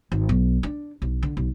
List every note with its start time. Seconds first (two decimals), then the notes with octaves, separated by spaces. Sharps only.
0.12 G#1
0.29 B1
0.63 D4
1.02 B1
1.22 D3
1.37 B1